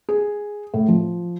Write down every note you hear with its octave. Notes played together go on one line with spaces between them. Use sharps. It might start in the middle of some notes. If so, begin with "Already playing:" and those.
G#4
A2
F3